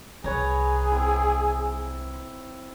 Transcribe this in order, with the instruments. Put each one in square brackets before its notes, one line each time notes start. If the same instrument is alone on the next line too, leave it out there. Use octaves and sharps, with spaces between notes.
[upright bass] C2 [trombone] G#4 [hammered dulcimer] B4 C#5 A#5
[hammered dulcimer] C4 E4